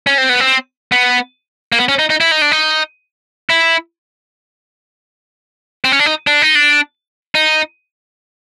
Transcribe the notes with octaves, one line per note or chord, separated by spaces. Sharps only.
C#4
C4
B3
C4
B3
A#3
B3
C#4
D#4
D#4
E4
D#4
D4
D#4
E4
C4
C#4
D4
D#4
D4
D#4
D4
D#4